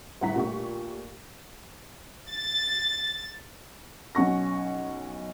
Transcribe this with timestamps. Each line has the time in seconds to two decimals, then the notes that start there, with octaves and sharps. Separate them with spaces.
0.21 G1 A2 F#5 A#5 B6
0.36 A#2 A3 G4 C#6
2.31 A6
4.15 B1 C#4 F#5 C#6 A#6